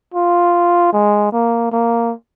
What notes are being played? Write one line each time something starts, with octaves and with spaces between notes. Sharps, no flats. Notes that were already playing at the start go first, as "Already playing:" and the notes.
F4
G#3
A#3
A#3